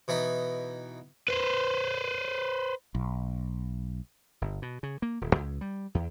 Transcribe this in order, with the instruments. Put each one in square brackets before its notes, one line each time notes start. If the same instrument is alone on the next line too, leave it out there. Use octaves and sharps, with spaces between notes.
[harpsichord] B2 E3 D#4 B5
[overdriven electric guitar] B4 C5
[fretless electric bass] B1
[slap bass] G1
B2
C#3
A#3
D#1
C#2
G3
E2